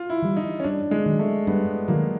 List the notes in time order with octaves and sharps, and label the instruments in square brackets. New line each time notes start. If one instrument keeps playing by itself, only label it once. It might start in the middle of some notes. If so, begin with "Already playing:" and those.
Already playing: [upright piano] F4
E4
[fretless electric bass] E3 G3
[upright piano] D#4
C#4
[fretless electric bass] G2 [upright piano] D4
[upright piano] G#3
[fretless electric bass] D#3 F#3
[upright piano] A3
[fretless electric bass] G2 [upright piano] B3
[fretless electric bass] D#3 F#3 [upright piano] A#3